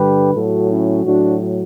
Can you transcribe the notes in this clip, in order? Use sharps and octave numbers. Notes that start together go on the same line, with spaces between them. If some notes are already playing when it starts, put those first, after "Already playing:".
Already playing: G2 D3 G3 G4 B4
A2 F#3 F#4 A4
C#4 E4
A2 F#3 D4 F#4